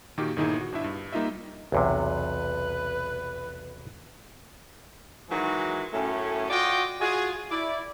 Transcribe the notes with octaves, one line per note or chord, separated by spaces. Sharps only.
A#2 D#3 A#3 D#4 F#4 G4
G1 A#2 D#3 D#4 E4 G#4
F#4
G1 D4 E4 E5
G2
G3 A#3 D#4 F4 D#5 E5
B1 E2 C3 B4
D#3 E3 F#3 G#3 F#4
F#2 A2 A3 C#4
F4 F#4 D5 D#5 G5
F4 F#4 G#4
E4 D5